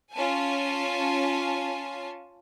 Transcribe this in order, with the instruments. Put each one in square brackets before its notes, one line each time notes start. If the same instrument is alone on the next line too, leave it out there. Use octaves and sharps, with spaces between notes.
[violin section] C#4 F4 G#5 A5